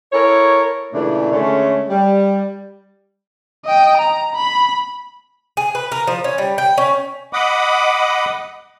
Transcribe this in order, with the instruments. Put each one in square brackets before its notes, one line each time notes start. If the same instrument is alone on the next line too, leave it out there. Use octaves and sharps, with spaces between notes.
[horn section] E4 A4 A#4 C#5
A#2 C#3 E3 A3 D4
D3 G#3 A3 C#4
G3
[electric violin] D#5 G5
A#5
B5
[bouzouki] G#4
B4
A#4
F3
C#4
G3
G5
C#4
[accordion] D#5 F#5 B5 D6 D#6